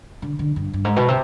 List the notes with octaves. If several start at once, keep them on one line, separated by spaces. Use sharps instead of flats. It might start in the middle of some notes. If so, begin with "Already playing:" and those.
D3
D3
G2
G2
G#2
B2
C3